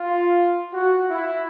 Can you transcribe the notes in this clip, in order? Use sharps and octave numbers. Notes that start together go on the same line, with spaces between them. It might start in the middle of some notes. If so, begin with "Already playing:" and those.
Already playing: F4
F#4
E4